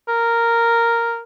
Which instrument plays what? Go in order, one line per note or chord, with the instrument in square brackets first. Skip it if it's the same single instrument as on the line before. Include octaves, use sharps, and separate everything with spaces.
[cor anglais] A#4